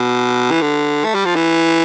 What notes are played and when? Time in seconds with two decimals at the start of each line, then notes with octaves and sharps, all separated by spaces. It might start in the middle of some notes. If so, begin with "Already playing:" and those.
Already playing: B2
0.51 E3
0.61 D3
1.04 A3
1.15 G3
1.25 F3
1.36 E3